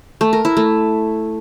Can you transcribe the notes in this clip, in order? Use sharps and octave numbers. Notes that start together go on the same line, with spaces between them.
A3
A#4
E4
A3